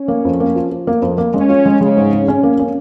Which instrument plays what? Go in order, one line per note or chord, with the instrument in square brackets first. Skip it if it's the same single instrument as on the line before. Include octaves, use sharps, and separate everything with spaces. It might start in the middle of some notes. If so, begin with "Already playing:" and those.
Already playing: [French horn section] C#4
[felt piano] A#3
F2
A#3
F3
F3
A#3
F2
A#3
[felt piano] G#3 [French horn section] C#4
[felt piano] F4
G#3
[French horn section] C#3 [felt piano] G#3
[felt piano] G#2
C#4
C#4
A#3
C#4